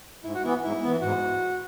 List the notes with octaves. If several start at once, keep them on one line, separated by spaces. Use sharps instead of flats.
G#2 E4
F#4
E3 B3 E4
G#2 E4
E3 B3
G#2 F#4